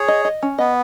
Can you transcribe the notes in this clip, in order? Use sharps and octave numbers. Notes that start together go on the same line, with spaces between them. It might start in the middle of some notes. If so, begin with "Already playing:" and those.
Already playing: G#4 C#5
D#5
D#5
C#4
B3 D#5